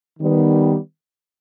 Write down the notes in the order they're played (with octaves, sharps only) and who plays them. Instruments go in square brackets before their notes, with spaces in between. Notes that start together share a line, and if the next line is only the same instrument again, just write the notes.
[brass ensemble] D#3 G3 B3